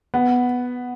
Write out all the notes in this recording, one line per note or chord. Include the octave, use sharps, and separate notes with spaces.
B3